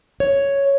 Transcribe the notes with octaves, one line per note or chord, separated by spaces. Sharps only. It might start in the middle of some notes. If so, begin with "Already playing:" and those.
C#5